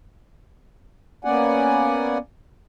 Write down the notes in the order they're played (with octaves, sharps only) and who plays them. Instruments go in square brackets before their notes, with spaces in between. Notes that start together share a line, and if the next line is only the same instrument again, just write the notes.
[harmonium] A#3 B3 C#4 D5 F#5 G#5